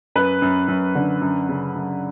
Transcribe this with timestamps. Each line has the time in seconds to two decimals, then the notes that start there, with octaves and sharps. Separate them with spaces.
0.16 F#2 B4
0.42 F#2
0.68 F#2
0.95 D3
1.22 F#2
1.49 C#3
1.75 F#2